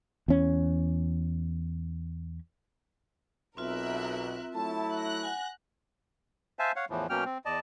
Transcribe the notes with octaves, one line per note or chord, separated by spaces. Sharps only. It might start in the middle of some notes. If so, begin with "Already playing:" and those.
E2 C#4
B1 B2 C4 F4 A#4 E5 F#6
F#3 A3 E4 A5
F#6 A#6
F#5 G#5
C5 E5 F5 G#5 A5
C#5 F5 F#5
E2 A2 E3 F3
B2 F#3 A#3 C#4 G5 F6
C4
E2 D5 D#5 A5